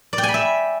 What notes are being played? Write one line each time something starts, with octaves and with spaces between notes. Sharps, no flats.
D5
G5
G#5
B5
E5